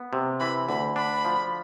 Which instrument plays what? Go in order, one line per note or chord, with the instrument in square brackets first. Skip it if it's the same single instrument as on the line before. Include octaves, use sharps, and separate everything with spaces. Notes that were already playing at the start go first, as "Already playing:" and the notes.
Already playing: [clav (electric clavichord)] B3
C3
[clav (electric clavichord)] E3 [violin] B5
[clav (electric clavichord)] D2 [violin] B5
[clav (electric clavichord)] D4 [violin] B5
[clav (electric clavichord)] F3